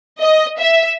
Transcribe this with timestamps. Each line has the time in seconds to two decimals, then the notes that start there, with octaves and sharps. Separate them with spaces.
0.19 D#5
0.58 E5